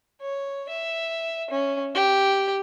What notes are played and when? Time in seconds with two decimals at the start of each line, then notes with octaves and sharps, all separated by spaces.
0.22 C#5
0.69 E5
1.51 C#4
1.95 G4